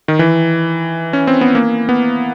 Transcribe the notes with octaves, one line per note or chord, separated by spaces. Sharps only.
D#3
E3
C#4
C4
B3
A#3
B3